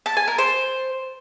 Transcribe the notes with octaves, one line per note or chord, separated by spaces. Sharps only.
A5
G#5
A#4
C5